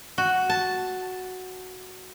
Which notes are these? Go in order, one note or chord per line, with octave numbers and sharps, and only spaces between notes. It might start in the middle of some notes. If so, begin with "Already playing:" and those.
F#4
A5